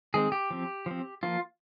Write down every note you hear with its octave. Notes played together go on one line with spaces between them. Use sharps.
D#3 G#3 C4 G#4
G4
F3 C4
F3 C4
F3 A#3 F4